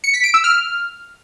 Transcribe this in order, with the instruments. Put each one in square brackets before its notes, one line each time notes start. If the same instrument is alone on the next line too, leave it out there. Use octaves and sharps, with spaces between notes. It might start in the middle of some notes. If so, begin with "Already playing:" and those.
[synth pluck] C#7
B6
D7
E6
F6